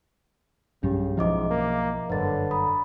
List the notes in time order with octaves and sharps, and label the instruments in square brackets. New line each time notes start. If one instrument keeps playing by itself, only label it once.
[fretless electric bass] B1 G2 G3 [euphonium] C#3 [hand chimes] C#4 G4
[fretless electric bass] B1 F3 [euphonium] G#2 [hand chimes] E4 D#5 D6
[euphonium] A#3
[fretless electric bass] F#1 G2 [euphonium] D3 [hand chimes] B4 C#5 A6
[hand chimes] A#5 B5 D#6